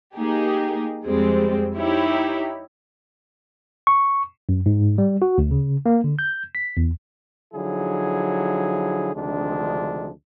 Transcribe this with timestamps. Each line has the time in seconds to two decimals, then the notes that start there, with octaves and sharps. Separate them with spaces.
0.17 A#3 D#4 G4 G#4
1.04 F2 G3 G#3 C4
1.78 D#4 E4 G4 C#5
3.87 C#6
4.49 F#2
4.66 G#2
4.98 G3
5.22 F#4
5.38 D2
5.51 C#3
5.86 A#3
6.04 D3
6.19 G6
6.55 B6
6.77 E2
7.54 D3 F3 F#3 D#4 E4 G#4
9.14 D2 C3 D#3 F3 G#3 D4